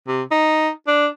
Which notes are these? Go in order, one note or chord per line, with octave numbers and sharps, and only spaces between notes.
C3
D#4
D4